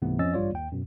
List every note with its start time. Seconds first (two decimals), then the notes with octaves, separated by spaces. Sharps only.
0.02 C#2 G#2 C3 E3 A3 B3
0.19 F2 F3 C#4 D#5 E6 A6
0.34 A1 G2 G3 F4 C#5 D5
0.52 D#2 G5
0.72 F#2 B2